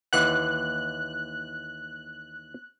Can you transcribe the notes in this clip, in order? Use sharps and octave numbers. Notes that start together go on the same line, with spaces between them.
D#2 E3 F#5 F#6